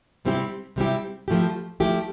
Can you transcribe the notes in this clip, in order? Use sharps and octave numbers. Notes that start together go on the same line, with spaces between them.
C3 G3 C4 E4 G4
C3 G3 C4 E4 G4
F3 A3 E4 G4
F3 A3 E4 G4